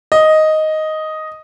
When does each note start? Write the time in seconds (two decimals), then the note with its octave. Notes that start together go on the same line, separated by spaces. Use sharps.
0.12 D#5